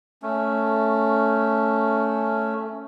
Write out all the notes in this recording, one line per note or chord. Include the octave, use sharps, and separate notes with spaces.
A3 C#4